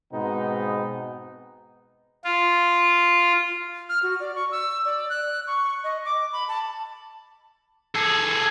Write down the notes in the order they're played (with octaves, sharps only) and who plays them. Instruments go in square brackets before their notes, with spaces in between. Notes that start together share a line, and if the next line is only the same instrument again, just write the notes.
[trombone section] G#2 B2 B3 C4 D#4
[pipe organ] F4
[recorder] F6
F#4
D5
C#6
E6
D5
F#6
C#6
D#5
D6
B5
A5
[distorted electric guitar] G#4 A4